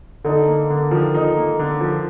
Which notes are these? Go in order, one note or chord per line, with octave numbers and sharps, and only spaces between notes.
D3 D#4
A#3
D3
D#3 F3
D#4
A#3
D3
F3